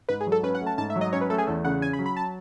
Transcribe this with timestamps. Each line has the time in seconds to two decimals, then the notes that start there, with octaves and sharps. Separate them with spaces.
0.09 G#2 B4
0.21 G#4
0.27 F#3
0.32 A4
0.43 C#4 B4
0.55 F#5
0.61 A3
0.66 A5
0.78 G#2 A5
0.90 E5
0.96 F#3
1.01 D#5
1.13 C#4 C#5
1.21 B4
1.30 A3 A4
1.38 G#4
1.47 E2 A4
1.65 C#3 F#5
1.81 C#4 G#5
1.93 B5
1.99 F#3
2.06 B5
2.16 A5